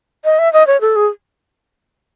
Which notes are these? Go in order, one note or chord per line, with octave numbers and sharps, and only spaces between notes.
D#5
E5
D#5
C#5
A4
G#4